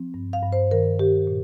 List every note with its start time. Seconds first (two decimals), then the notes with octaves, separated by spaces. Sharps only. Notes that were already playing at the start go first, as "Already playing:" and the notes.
Already playing: F3 C4
0.14 G2
0.33 F5
0.43 G2
0.53 C5
0.71 D#3 A#4
0.99 D#3 G4
1.27 A#2